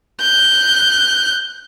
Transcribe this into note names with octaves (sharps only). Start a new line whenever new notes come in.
F#6 G6